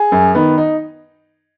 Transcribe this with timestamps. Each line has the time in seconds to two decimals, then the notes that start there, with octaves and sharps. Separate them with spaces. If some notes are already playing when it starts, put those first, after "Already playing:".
Already playing: G#4
0.12 F#2
0.35 D#3 B3
0.58 D#4